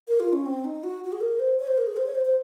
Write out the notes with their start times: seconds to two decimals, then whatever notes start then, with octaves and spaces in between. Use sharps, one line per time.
0.08 A#4
0.20 F4
0.33 C#4
0.46 C4
0.64 D#4
0.84 F#4
1.04 F#4
1.12 G#4
1.21 A#4
1.39 C5
1.59 C#5
1.67 C5
1.78 A#4
1.87 G#4
1.97 C5
2.06 C#5
2.15 C5
2.25 C5